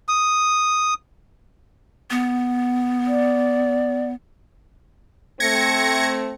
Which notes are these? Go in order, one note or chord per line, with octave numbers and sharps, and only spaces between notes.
D#6
B3
D5
A3 C4 G#6 A#6 C#7